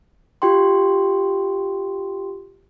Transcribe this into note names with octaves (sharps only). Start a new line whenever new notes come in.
F4 G4 G5 C6